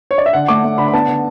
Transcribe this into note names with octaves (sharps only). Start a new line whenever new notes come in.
C#5
D5
E5
D3 F#5
A3 D6
A3
D3 B5
B5
B3 A5
D3